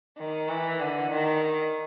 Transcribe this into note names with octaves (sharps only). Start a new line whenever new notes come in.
D#3
E3
D3
D#3